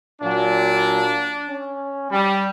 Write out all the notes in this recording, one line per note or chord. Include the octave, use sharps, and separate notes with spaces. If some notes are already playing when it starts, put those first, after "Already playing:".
A#2 F#3 D4
C#4
G3